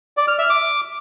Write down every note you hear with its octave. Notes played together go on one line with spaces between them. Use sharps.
D5
F6
E5
D6